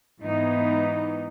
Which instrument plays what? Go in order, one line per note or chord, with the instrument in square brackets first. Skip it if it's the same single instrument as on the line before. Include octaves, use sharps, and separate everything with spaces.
[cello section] G#2 E3 B3 D#4